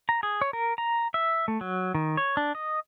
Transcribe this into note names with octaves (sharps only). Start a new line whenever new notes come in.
A#5
G#4
C#5
A#4
A#5
E5
A3
F#3
D#3
C#5
D4
D#5